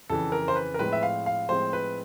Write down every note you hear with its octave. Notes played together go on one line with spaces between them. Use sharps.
F2 C#3 E3 A4
A#4
C5
B4
A#4
A2 F3 G#3 C4 B4
E5
F5
F5
A2 F3 G#3 C4 C5
B4